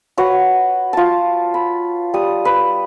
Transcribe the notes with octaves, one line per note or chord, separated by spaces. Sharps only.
F#4 B4 C#5 F#5
F4 A5
B5
G3 D#6
B4